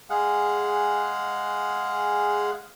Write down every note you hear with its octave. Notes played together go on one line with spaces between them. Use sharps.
G#3 G#4 F5 F#5